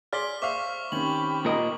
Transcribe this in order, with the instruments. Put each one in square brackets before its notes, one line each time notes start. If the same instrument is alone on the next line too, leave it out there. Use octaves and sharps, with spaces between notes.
[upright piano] G#4 D5 C6 [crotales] F6 B6 G7
[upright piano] C5 E5 F5 [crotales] C#6 D6
[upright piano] D#3 C4 C#4 [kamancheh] G4 B5 [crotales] F#7
[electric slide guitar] A#2 A#4 D#5